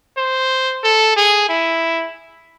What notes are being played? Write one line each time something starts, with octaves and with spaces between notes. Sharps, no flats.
C5
A4
G#4
E4